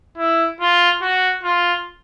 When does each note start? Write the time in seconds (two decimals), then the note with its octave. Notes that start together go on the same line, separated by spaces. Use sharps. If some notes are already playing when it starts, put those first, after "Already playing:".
0.18 E4
0.60 F4
1.02 F#4
1.44 F4